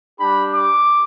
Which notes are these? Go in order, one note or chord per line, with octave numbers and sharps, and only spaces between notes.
G3 D4 G4 B5
D6